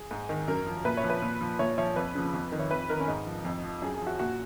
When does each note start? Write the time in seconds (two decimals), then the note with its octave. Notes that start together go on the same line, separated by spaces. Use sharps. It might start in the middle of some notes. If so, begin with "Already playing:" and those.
Already playing: G#4
0.11 G#2
0.29 D#3
0.48 F#2 A#4
0.66 F3
0.85 A#2 B4
0.97 C#5
1.04 F3
1.10 B4
1.22 A#2
1.41 F3
1.59 A#2 C#5
1.78 F3 C#5
1.96 F2 B4
2.15 C#3 F3
2.34 F2
2.52 D#3
2.59 C#5
2.71 F2 B4
2.89 D#3 A#4
3.00 C#4
3.08 G#2 D#4
3.26 F3
3.45 F2
3.63 F3
3.82 F#2 G#4
3.94 G#4
4.01 F3
4.07 F#4
4.19 A#2 F#4